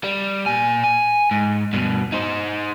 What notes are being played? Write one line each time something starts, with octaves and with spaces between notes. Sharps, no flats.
G3
A#2 G#5
G#5
G#2
G2 B2
D#4 C5